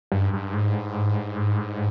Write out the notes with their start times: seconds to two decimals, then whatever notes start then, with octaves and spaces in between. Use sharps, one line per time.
0.12 G2
0.33 G2
0.53 G#2